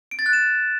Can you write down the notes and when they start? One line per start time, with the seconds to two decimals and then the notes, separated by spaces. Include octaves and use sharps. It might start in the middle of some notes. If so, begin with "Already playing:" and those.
0.11 D7
0.19 A6
0.26 F#6
0.33 E7